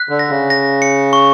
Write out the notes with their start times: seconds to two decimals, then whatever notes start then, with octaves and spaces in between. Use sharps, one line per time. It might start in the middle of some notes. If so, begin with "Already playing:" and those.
Already playing: F#6 B6
0.09 D3
0.19 A#6
0.29 C#3
0.50 A#6
0.82 C#7
1.13 C#6